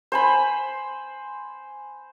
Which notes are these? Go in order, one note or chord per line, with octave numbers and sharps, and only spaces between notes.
C5 G#5 B5